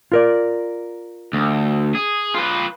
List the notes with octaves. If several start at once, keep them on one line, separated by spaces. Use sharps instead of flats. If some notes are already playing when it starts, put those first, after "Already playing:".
F4 A#4 D5
D2
G#4
F4 B4